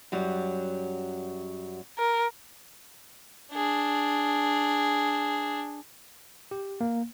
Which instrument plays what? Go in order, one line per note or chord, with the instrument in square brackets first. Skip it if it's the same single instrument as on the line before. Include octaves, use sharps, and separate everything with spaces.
[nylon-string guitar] F#2 F#3 G3
[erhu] A#4
[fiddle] D4 G#4
[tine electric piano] G4
A#3